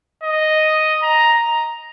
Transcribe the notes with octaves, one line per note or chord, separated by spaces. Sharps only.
D#5
A#5